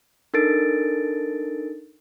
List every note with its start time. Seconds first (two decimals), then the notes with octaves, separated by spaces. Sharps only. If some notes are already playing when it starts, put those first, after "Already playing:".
0.34 D4 D#4 A4 A#4 A6 D7